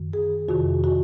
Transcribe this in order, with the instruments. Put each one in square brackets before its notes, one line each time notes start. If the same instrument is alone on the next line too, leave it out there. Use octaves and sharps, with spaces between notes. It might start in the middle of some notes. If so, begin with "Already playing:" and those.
Already playing: [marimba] F#2 D#3
G#4
F2 C3 D#3 F#4
F#4